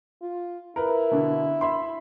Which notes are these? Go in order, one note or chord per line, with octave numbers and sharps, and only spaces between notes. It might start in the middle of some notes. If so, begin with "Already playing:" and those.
F4
E4 A#4 B4
B2 D3
E5 B5 C6